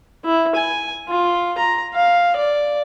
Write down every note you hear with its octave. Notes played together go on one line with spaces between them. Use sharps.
E4
G#5
F4
A#5
F5
D5